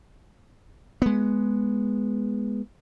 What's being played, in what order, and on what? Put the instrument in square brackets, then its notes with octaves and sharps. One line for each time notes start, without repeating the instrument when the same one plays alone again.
[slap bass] G#3 B3